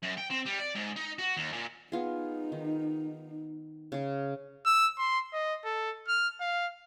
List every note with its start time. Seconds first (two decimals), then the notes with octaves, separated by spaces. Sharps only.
0.03 F#2
0.18 G5
0.31 C4
0.46 G3
0.60 D5
0.75 G#2
0.96 D#4
1.19 F#4
1.37 D#2
1.52 A#2
1.92 B3 D#4 F4 G#4
2.52 D#3
3.92 C#3 G#4
4.66 E6
4.98 C6
5.33 D#5
5.65 A4
6.08 F6
6.41 F5